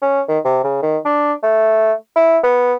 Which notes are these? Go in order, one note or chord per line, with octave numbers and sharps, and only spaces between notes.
C#4
D#3
C3
C#3
D#3
D4
A3
E4
B3